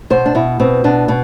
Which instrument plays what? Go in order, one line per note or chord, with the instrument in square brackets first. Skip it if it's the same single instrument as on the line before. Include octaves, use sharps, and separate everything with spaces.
[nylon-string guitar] B2 C5
D4
B2 E4
B2 C4
B2 D4
B2